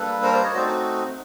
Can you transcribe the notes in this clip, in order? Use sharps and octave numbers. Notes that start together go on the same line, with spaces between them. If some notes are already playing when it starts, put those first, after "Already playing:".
Already playing: G3 A#3 D4 A4 B4
A#4 C5
C5 D5
C#5 D#5
A3 C4 D#4 F#4 C5 D5